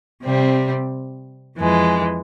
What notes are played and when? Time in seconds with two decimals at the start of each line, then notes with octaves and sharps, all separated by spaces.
0.24 C3 G3 C4
1.57 F2 E3 G#3